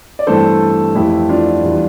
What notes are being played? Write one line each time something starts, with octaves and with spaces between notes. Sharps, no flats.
D5
G2 E3 A3 C4 A4 C5
F2 E3 A3 E4 G4
D4 F4
E2 E3 G3